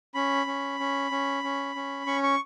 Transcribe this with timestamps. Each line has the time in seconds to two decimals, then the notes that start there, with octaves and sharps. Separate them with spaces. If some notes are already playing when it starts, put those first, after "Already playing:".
0.15 C#4 B5
0.47 C#4
0.80 C#4
1.11 C#4
1.44 C#4
1.75 C#4
2.07 C#4 C#6
2.23 C#6